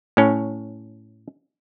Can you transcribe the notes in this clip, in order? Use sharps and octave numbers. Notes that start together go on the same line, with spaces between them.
A2 C#4